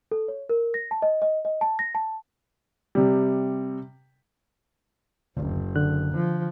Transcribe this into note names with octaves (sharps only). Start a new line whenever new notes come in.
A4
C#5
A#4
A#6
A5
D#5
D#5
D#5
A5
A#6
A5
C3 G3
F#1 D2
D3 F#6
F3